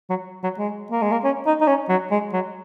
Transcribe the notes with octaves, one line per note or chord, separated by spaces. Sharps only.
F#3
F#3
G#3
A#3
G#3
A#3
C#4
D#4
D#4
C#4
F#3
G#3
F#3